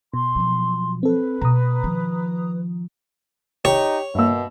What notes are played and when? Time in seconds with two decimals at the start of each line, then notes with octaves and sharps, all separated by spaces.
0.14 B2 C6
0.36 F3 F#3
1.03 C4 A4 B4
1.41 B2 B3 A#5 D#6
1.84 D#3 F3
3.65 D#4 G4 C#5
4.15 G2 B2 A#3 E5 E6